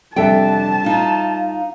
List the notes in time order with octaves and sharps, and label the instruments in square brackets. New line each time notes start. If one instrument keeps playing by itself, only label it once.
[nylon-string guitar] F2 C3 G5 [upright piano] G3 A4 E5 [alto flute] D4 [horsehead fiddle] A5
[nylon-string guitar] D#4 F4 [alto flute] F5